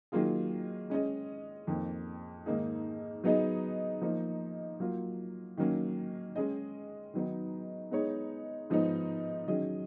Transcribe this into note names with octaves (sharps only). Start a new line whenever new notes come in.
D#3 F#3 A#3 F4 G#4
G#3 C#4 G#4 D#5
F2 D#3 A#3
G#2 D#3 A#3 D#4 G#4
F#3 B3 D#4 G#4 D#5
F3 A#3 D#4
F#3 A#3 F4
D#3 F#3 A#3 C#4
G#3 C#4 G#4 D#5
D#3 F#3 B3 D#4
G#3 B3 D#4 G#4 C#5
G#2 F3 B3 D#4
D#3 F#3 C#4 G#4 D#5